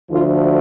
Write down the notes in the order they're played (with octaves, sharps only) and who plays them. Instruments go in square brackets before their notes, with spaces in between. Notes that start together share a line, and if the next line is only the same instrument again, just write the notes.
[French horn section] D2 D3 F3 F4